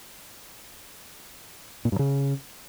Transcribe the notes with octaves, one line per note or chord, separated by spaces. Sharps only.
A#2
G2
C#3